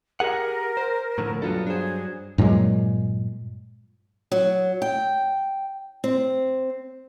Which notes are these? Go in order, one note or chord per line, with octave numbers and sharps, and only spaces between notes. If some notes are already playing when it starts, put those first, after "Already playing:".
G4 G#4 A#4 F#5
C5
A2 D3 F3
G2 F#3 B3 F4 A4
D4 G#4 C5
G2 A#2 F#3 G#3
F#3
G5
C4